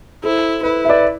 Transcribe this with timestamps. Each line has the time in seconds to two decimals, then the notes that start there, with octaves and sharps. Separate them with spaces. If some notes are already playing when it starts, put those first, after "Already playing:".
0.24 E4 A4 C5
0.63 E4 B4
0.85 E5
0.89 B4 D5